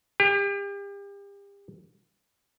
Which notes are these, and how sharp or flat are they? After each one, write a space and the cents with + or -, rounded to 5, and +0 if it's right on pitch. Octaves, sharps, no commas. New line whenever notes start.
G4 +35